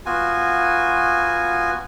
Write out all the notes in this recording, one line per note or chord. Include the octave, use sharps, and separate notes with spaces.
B3 F4 F#4 G#5